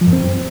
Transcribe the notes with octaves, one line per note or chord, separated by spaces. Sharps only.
F3
F#2
C4